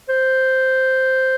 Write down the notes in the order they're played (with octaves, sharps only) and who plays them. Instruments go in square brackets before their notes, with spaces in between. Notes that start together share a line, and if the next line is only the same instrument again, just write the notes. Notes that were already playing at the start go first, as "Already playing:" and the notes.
[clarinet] C5